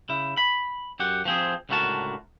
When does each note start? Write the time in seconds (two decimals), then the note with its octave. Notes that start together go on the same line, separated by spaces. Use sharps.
0.09 C#3 E4
0.38 B5
1.00 F#2 G4 F#5
1.25 F3 C4 G#4
1.69 C#2 A2 D3 F#4 A#4 A5